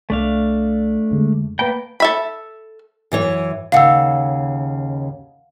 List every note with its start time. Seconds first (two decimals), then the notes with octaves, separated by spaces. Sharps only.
0.10 C2 A3 D4 F5
1.11 F2 D3 G#3
1.59 A#3 B3 B4 G5 A5 B5
2.00 A4 E5 B5
3.12 F#2 E3 C#5
3.72 D#2 C#3 F5 F#5 E6